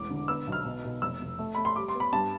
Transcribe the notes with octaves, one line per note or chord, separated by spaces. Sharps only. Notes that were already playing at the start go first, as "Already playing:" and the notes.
Already playing: E1 A1 D6
D3
B3 E6
B1
F6
B2
B2
F1 E6
F1
A3
A3 B5
C6
G3 D6
C6
B3
B5
G2 A5